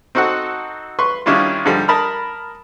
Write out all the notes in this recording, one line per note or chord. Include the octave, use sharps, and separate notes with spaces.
C4 D#4 F#4 A4 F#5
B4 C6 C#6
D#3 G3 C#4 D4 E4 F4
G#2 D3 F3 G3
A#4 A5 B5 D#6 F6